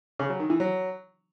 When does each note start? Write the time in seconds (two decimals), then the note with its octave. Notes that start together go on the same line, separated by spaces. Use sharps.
0.19 C#3
0.30 F#3
0.40 D#3
0.50 E3
0.60 F#3